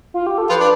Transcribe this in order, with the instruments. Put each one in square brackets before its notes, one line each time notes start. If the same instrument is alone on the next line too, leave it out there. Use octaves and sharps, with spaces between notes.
[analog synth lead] F4
G4
A4
[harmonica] F3 F4 [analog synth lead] B4
[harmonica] D4